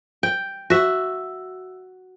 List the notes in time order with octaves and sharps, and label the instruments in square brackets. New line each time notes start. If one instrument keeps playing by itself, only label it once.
[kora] G5
F#4 E5